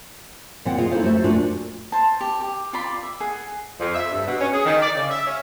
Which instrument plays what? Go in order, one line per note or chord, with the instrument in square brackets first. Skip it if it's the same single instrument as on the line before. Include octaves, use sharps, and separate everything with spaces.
[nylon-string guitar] A#2 C4 F#5 G5
F4 G#4 A#4 D#5 E5
D#4 E4 F#4 A4 C5 F5
A3 F#4 C5 E5
A#2 A3 D4 F4 F#4
[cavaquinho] C5 A5
G4
G4
F4 D5 B5 D6
E5
G#4 F#5
[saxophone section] F2
E5
G2
B2
C#4
G#4
D#3
D5
C#3
E5
C#4